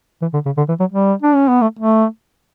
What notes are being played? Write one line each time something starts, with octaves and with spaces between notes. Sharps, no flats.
E3
D3
C#3
D3
E3
F#3
G3
D4
C#4
B3
A3
A3